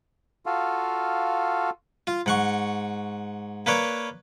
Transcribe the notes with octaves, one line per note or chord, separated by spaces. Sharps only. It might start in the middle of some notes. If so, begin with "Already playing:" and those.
F4 F#4 A4 F5
F4
G#2 F#5 C#6
A#3 B4 C#5 D5